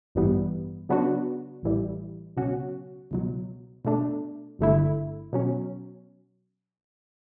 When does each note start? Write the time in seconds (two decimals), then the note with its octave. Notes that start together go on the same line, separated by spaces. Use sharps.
0.15 A1 G2 E3 G3 B3
0.89 C#3 F#3 B3 D4 F#4
1.63 A1 A2 E3 G3
2.37 C#2 B2 F#3 C#4 F#4
3.11 C#2 B2 F#3
3.85 B2 A3 D4
4.59 G1 G2 D3 A3 E4
5.33 B2 F#3 C#4